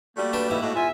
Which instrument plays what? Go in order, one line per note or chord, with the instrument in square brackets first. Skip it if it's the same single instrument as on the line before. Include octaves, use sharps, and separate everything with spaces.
[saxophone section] G3 A3 F#4 [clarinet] A#3 [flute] D5
[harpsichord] D4 B4 G5
[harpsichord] G#2 E4 [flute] B4
[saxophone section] A2 F#4 [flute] D#5
[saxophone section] E2 B2 E5 [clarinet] F4 [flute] G#5